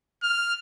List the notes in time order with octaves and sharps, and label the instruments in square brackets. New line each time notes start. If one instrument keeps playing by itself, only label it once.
[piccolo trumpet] F6